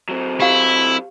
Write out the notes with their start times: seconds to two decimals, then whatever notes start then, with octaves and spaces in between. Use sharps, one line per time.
0.09 F#3 C4
0.40 E4 G4 F5